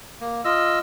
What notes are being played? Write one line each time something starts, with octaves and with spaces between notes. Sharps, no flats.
A#3
F4 D#5 E6